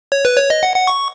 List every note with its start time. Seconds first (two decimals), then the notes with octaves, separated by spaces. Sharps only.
0.12 C#5
0.25 B4
0.37 C#5
0.50 D#5
0.63 F#5
0.76 F#5
0.87 C#6